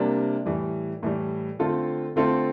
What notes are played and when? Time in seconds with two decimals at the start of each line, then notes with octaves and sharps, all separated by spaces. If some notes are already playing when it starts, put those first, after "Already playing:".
Already playing: C3 G3 A#3 D4
0.46 A2 E3 G3
1.03 A2 E3 G3
1.59 D3 A3 C4 F4 A4
2.16 D3 A3 C4 F4 A4